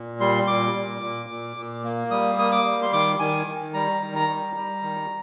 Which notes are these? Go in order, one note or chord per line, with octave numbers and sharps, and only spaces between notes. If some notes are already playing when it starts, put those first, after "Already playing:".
Already playing: A#2
G3 C6
A#2 D6
A#2
A#2
A#2
A#2
A#3
G3 D#6
A#3 D#6
D6
G3
C6
D#3 D6
D#3 G#5
D#3
G3 A#5
D#3
A#5
G3
G3
D#3